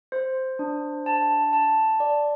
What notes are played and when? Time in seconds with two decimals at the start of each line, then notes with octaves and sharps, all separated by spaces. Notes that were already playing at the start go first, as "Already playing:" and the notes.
0.12 C5
0.59 D4
1.06 A5
1.53 A5
2.00 D5